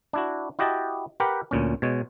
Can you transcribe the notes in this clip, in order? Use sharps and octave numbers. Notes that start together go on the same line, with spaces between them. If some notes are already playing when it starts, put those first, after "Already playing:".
D4 E4 F#4
E4 F#4 G4 D#5 G5 A5
G4 A#4 B4 F#5 G5
D2 A#2 C#4
B2 G#3 C#5